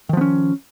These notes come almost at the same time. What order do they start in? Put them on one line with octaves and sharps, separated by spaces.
D#3 F3 B3 C#4